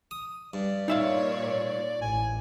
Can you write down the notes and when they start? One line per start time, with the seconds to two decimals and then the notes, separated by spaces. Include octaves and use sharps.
0.11 D#6
0.54 G2 D5
0.88 A#2 D#4 C#5 E5 F5
2.02 A1 G#5